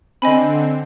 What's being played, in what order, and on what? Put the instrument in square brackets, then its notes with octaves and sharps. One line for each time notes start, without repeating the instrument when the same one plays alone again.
[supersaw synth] D3 C4 [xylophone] D#5 G#5 B5